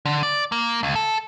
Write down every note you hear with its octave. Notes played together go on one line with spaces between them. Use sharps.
D3
D5
A#3
C#2
A4